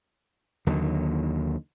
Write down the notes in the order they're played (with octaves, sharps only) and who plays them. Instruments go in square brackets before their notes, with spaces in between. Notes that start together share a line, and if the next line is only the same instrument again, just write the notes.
[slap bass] D#2 D3 D#3 F#3